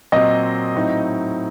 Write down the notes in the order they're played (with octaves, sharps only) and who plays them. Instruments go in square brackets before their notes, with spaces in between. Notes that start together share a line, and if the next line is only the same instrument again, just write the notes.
[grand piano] A#2 F#3 C4 [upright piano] D#5
[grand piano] A2 F#3 C4 D#4